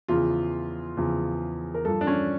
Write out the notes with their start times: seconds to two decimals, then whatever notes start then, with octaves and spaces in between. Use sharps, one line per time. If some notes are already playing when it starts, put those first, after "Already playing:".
0.08 E2 C#3 F3 F4
0.97 E2 C#3 F3
1.74 A#4
1.85 G2 F3 A4
2.01 D4
2.07 C#4